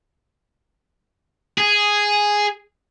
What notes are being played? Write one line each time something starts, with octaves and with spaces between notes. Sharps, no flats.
G#4